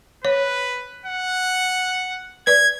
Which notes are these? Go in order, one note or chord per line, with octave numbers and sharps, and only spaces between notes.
B4 C#5
F#5
B4 D5 G#6